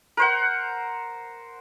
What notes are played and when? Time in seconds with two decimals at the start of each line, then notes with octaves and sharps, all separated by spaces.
0.17 A#4 C5 F#5